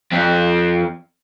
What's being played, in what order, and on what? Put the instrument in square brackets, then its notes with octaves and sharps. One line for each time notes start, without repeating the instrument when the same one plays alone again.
[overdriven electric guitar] F2 C4